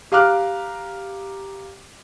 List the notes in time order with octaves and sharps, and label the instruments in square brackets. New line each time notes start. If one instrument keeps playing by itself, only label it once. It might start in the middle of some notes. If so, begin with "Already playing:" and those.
[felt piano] G4 F5 A#5 D6 F6 F#6